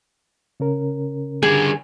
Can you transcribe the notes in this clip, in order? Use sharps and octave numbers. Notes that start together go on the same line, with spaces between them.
C#3 C#4 A#4
D3 G3 G#4